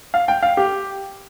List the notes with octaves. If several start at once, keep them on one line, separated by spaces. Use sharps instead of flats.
F5
G5
F5
G4